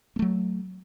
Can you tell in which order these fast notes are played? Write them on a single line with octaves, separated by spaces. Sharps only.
A#3 A3 F#3